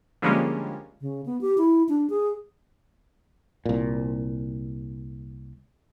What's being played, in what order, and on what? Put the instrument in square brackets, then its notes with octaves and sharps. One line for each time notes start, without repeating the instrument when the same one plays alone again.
[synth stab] D3 F3 G3 G#3 A#3 C#4
[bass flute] C#3
B3
G4
E4
D4
G#4
[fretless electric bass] C2 A#2